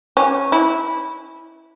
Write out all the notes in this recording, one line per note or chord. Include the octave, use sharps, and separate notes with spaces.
C#4
E4